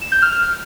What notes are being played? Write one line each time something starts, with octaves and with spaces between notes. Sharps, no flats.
E7
G6
F6